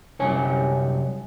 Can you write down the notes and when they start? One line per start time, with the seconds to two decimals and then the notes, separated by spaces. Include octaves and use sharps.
0.19 C2 F#2 C#5 G#5